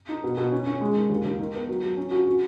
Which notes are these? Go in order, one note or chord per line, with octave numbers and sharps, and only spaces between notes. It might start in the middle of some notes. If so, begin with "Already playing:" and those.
D#4
B2
B2
C#4
C#4
G#3
D#3
D#2
D#2
D#3
B3
F#3
F#3
C#4
F#4
F#4